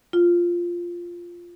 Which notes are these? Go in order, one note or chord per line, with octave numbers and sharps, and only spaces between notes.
F4